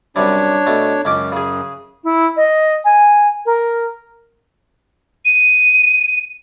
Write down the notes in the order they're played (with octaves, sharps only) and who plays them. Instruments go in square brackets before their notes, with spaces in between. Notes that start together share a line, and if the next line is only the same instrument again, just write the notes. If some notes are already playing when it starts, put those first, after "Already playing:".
[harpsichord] F#2 C3 G3 [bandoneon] D4 C#5
[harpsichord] B2 A3
[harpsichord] C#2 C#4 D6 [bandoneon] F#2
[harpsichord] C#3 G#4
[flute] E4
D#5
G#5
A#4
[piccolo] D#7